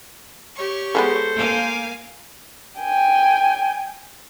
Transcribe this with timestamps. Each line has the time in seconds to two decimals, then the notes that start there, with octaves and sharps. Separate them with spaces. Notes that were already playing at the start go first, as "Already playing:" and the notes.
0.54 G4 C#5 C#6
0.95 F3 G#3 B3 A4 C5
1.35 A#3 F5 G#5
2.81 G5 G#5